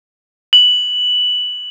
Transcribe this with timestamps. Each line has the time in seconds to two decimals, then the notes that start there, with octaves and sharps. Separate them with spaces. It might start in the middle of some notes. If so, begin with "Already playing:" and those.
0.53 F#7